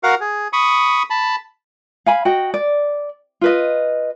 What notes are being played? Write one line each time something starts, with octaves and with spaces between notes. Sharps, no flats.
F#4 A#4 F5 F#5
G#4
B5 C#6 D#6
A5 B5
F5 G#5 B5
F#4 D#5 G5
D5
F4 B4 D#5